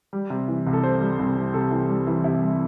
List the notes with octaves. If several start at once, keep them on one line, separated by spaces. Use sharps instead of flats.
G3
C3
E3
C2
A4
C3 C5
G3
C2
C3
C3 A4
E3
G3
E3
C3 E4
G3